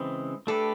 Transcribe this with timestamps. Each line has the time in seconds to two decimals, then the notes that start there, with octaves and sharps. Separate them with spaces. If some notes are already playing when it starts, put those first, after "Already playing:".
Already playing: C#3 E3 G#3 C4
0.47 A3 D4 G4 A4 B4